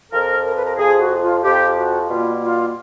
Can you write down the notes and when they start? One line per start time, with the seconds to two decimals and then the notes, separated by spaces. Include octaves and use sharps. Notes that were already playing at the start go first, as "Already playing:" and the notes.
0.12 F2 C3 F3 A#4
0.45 A#4
0.56 B4
0.66 A#4
0.78 F2 C3 F3 G#4
0.99 F#4
1.22 F4
1.43 F2 C3 F3 G4
1.76 F#4
2.08 B2 G3 A#3 F4
2.41 F4